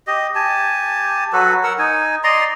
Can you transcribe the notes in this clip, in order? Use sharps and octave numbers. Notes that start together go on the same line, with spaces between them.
G4 D#5
G4 G#5 A5
F#3 F#4 A4 B4
A#4 F#5 E6
D#4 G#5
D5 D#5 A#5 C6